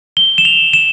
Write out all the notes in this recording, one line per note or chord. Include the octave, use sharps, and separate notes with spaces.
G7
E7
F7
E7